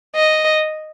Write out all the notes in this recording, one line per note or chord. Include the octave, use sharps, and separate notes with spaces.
D#5